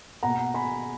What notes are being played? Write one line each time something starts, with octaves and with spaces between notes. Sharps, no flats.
B2 A#3 F#5 A#5
G#5 B5